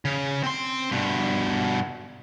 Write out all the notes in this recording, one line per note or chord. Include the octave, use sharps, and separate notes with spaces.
C#3
C4 C6
G2 B2